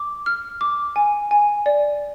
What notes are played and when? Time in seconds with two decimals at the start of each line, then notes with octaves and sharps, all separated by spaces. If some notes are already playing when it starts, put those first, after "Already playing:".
Already playing: D6
0.26 F6
0.61 D6
0.96 G#5
1.31 G#5
1.66 D5